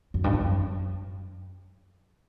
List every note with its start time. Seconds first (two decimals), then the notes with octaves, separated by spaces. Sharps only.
0.14 F#2
0.24 G2
0.33 F#2